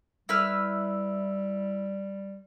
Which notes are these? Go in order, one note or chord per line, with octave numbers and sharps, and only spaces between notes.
G3 E4 B4 F6